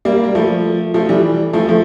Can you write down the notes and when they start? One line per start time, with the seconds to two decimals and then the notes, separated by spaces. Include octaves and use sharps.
0.05 G3 A#3
0.24 G3
0.35 F3 A3
0.94 F3 A3
1.09 E3 G3
1.53 F3 A3
1.69 F3 A3